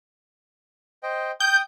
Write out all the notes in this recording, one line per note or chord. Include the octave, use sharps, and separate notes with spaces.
C5 D#5 G5
G5 D#6 G6